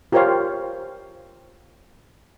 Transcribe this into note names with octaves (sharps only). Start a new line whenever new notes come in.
F4 G4 A#4 C5 C#5 F5